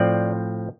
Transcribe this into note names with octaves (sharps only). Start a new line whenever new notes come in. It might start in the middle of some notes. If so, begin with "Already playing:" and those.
Already playing: A2 F3 C4 D5